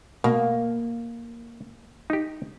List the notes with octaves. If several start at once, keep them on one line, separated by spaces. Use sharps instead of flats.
B2 A#3
D#4 G4